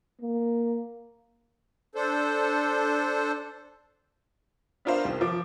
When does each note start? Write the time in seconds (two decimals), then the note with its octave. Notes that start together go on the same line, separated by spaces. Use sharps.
0.21 A#3
1.95 D4 A4 C5
4.85 B3 D4 F4 A#4 C5 F5
5.05 C2 D#3
5.21 F3 D6